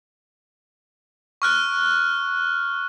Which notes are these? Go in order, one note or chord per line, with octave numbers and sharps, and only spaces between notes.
C#6 F6 F#6